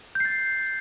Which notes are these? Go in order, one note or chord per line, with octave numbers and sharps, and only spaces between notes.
G6 A6 C7